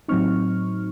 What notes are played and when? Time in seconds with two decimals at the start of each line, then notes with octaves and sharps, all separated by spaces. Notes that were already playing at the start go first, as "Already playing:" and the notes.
0.08 A2 F#3 C4 D#4 C#6 F6